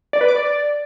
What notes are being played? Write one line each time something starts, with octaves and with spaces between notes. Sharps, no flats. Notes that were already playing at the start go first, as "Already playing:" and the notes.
D5
B4
D6
D5